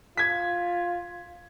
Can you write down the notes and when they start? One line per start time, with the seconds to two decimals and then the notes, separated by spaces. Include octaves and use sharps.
0.18 F4 G#6 B6